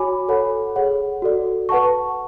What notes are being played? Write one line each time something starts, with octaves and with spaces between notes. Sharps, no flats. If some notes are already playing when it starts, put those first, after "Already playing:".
Already playing: F#4 C#5 G#5 B5 D6
A4 C#5 F#5 B5
G#4 C#5 F#5
F#4 A4 D5
B4 F#5 A5 C#6